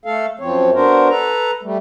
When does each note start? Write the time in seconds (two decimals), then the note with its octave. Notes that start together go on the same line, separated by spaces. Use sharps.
0.05 A3 A4 F5
0.40 F#2 F3 C4 C#5
0.74 B3 D4 F#4 A#4 C5
1.09 A4 B4 A#5
1.62 G3 A3